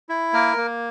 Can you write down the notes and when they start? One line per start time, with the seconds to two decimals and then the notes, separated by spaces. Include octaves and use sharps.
0.09 E4
0.33 A#3 A#4
0.57 A#3